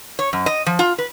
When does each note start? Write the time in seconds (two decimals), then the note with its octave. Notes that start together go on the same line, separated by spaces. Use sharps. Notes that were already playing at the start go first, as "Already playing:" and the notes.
0.19 C#5
0.33 F#2
0.46 D#5
0.66 F3
0.79 F4
0.98 B4